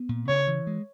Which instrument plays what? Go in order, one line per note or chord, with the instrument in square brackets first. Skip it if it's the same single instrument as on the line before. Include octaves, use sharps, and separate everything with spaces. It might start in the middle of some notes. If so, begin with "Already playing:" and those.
Already playing: [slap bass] B3
A#2
[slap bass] C#3 [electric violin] C#5
[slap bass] E3
G#3